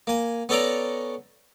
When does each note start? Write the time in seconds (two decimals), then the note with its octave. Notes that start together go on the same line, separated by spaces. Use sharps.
0.07 A#3 G#5
0.49 B3 C#4 A4 D5 A#5